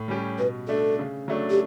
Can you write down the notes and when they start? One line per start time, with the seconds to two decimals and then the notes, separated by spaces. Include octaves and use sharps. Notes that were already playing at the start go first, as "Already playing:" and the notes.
Already playing: A2
0.08 G3 C#4 G4
0.39 B2 B4
0.68 A3 D4 A4
0.99 C#3
1.28 F#3 A3 D4
1.50 G4